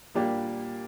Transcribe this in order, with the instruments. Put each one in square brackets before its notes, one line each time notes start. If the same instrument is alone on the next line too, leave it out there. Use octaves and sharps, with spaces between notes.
[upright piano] A#2 G3 D4 G4 [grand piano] A#3